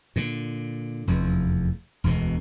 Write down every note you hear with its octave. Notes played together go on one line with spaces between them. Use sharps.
A#2 D3
F1 E2
E1 D2 B2